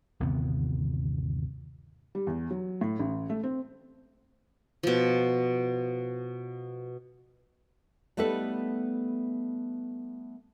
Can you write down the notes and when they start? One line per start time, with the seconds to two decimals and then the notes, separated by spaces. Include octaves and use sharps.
0.20 G1 D#2 C3 B3
2.15 G3
2.27 E2
2.51 F#3
2.81 A2
2.99 A1
3.30 A3
3.43 C4
4.83 B2 F3
8.17 G3 A3 B3 D#4 A4 B4